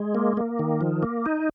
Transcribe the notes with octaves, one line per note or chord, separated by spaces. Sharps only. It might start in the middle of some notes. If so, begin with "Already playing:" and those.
Already playing: G#3
A#3
A#3
D#3
F3
A#3
D#4